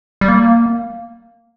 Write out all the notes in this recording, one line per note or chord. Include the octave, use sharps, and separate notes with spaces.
G3
A#3